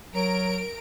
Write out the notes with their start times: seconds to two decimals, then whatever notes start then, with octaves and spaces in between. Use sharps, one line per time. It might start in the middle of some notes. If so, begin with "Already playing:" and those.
0.14 F#3 A#4 D7